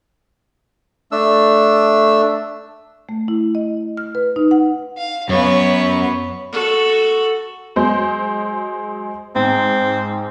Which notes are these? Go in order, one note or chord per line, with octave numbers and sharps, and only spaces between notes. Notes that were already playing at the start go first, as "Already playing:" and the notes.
A3 D4 E6
A3
E4
D#5
F6
B4
D#4
F#5
F5
F#2 B3 C#5
F#4 A4
F#3 G#3 C5
G#2 C4